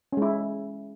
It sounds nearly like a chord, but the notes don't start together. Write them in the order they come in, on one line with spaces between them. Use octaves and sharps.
C#4 G#3 E4